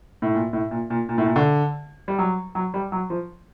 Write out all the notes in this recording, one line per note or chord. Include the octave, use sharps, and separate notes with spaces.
A2
A#2
A2
A#2
A#2
A#2
A2
A#2
D3
G3
F#3
F#3
G3
F#3
F3